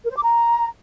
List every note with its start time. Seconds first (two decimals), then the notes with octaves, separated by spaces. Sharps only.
0.04 A#4
0.10 C5
0.16 D6
0.22 A#5